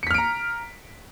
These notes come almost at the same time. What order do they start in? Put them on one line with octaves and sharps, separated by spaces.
C#7 B6 F6 D7 A#5